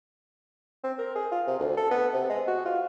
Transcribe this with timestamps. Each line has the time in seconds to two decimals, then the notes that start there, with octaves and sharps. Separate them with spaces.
0.84 C4
0.98 A#4
1.16 G#4
1.32 F4
1.47 C3
1.60 D2
1.77 A4
1.91 B3
2.13 C3
2.30 G#3
2.48 F#4
2.66 F4